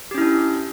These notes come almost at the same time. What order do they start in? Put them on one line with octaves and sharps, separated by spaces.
G4 C#4 E4 D4